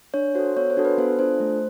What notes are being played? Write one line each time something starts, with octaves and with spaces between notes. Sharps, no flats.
D4 C#5
F#4 A4 C5
B3 C#5
C5
D4 F#4 A4
B4
B3 C5
D4 F4 A4 C5
A3 C5